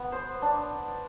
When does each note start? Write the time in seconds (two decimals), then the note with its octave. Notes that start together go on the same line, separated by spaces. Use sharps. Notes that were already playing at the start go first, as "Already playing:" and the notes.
Already playing: B3
0.12 C5
0.42 D4